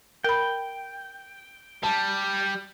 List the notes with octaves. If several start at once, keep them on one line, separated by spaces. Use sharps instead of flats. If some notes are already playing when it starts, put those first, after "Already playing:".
A#4 G5 B5
G3 A5